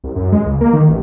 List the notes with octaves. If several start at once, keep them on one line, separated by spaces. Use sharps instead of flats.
C2
F#2
G#3
C#2
A#3
D#3
A1